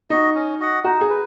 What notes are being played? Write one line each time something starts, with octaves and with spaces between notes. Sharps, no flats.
D#4 F#4 D#5
C#4
F#4 D#5 F#5
D#4 F#4
G#4
B4